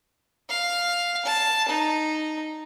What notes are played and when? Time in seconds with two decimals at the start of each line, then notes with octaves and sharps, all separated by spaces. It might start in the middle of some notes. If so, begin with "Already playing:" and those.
0.49 F5
1.25 A5
1.68 D#4